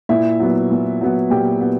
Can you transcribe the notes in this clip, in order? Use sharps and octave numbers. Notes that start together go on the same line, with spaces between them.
A#2 E4 E5
F#3 B3
A#2
F#3 B3
A#2 G4 G5
B3